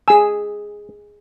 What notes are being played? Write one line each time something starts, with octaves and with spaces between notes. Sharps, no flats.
G#4 G#5 E6